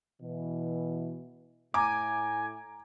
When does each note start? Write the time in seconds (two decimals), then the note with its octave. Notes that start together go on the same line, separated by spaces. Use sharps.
0.22 B2 E3
1.74 A2 G#5 A#5 D6